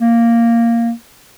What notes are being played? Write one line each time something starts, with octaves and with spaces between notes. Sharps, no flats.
A#3